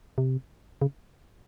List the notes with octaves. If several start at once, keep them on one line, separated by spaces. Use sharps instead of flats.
C3
C#3